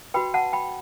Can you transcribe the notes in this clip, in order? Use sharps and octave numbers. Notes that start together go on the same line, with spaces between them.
F#4 B4 G5 B5
F#5 A5
G5 B5